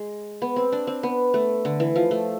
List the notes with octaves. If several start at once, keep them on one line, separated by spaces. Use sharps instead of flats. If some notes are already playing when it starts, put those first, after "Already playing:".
Already playing: G#3
B3
C4
D4
C4
B3
A3
D3
E3
F3
A3